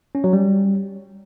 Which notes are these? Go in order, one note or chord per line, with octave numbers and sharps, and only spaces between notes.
C#4
F#3
G3